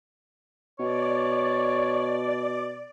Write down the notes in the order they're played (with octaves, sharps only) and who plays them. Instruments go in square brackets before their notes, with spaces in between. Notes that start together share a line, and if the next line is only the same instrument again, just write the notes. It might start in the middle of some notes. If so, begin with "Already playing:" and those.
[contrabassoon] B2 [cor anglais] C#5 [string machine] D5